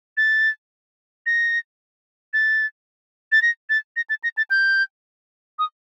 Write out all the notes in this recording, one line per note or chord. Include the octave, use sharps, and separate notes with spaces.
A6
A#6
A6
A6
A#6
A6
A#6
A6
A#6
A6
G6
D#6